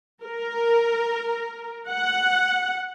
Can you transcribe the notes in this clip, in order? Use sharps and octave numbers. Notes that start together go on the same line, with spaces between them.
A#4
F#5